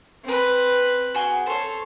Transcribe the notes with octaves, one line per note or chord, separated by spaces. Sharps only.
C4 B4
F#4 G#4 G5
A4 C5 C#5